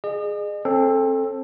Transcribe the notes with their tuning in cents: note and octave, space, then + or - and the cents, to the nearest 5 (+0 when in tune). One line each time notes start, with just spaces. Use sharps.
G#4 +0 D#5 -40
C4 +30 A4 +0